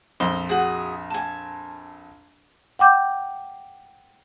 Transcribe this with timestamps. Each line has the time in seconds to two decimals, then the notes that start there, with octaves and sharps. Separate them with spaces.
0.20 A#1 F2 C6
0.49 F#4 G#4
1.10 G#5 A5
2.79 F#5 G5 D6 G6